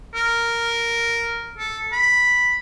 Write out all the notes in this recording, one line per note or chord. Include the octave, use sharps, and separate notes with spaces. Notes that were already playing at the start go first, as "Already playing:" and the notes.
A#4
A4
B5